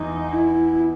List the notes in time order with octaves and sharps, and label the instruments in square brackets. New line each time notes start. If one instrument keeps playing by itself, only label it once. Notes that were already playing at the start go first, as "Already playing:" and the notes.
Already playing: [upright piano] E2 [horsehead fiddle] D#4
[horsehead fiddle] E4